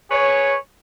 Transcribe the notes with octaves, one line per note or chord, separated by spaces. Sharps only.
G#4 B4 C#5